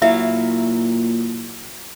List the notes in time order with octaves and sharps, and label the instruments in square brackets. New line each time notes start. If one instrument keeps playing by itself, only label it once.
[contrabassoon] A#2 [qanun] F#3 E4 F5 [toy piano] E5